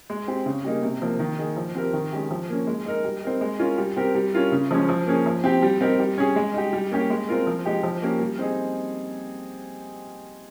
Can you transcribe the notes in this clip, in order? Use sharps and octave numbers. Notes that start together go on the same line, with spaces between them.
G#3
C4 G4
C#3
G3 A#3 D#4 G#4
C3
F3 A#3
D#3
A#3 D#4 G#4
F3
C4 G4 A#4
D#3
G#3 C#4 G4
F3
A#3 C#4
G#3
D#4 A#4
G3
C4 D#4 A#4
G#3
C#4 F4 A#4
G3
C4 G4 A#4
G3
C#4 F4 A#4
C#3
F3 G#3 C#4
F3
A#3 C#4 G#4
F3
C4 G4
G3
C4 D#4 G4 A#4
G3
C#4 G#4
G#3
D#4 G4
G3
A#3 C#4 G4
G#3
C4 F4 A#4
F3
G#3 D#4 G4
F3
A#3 C#4 G4 A#4
G3
C4 D#4 G#4